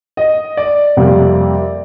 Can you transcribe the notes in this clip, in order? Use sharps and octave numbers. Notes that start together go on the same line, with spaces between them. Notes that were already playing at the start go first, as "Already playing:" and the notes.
D#5
D5
F2 C3 G3 A#3